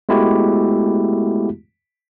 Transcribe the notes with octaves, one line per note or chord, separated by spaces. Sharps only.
G#3 A3 B3 E4 F#4 G4